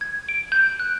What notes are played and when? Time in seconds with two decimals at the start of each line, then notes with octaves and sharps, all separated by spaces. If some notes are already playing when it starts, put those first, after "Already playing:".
0.01 G#6
0.29 D7
0.52 G6
0.80 F#6